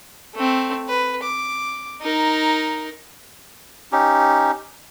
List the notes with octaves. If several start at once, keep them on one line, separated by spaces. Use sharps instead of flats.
A3 C4
B4
D6
D#4 A#4
C#4 D#4 G4